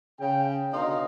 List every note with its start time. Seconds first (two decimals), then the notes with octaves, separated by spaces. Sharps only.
0.20 C#3 G5
0.72 B2 D3 D#4 C#5 F5 C6